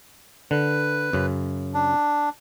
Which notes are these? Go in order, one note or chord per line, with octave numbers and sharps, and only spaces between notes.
D3 B4
F#2 C#3
D4